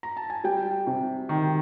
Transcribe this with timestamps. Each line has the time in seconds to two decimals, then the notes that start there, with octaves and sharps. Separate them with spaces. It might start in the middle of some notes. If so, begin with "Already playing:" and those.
0.03 A#5
0.17 A5
0.30 G#5
0.44 G3 G5
0.87 C3
1.29 D#3